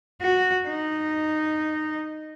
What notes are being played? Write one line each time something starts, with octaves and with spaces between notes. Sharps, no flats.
F#4
D#4